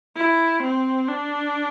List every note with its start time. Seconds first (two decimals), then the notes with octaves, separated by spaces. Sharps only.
0.17 E4
0.63 C4
1.08 D4